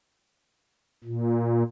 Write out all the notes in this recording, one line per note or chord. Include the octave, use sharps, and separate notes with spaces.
A#2